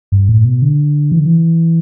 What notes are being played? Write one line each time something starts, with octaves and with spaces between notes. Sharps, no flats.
G2
A2
B2
D3
E3
D3
E3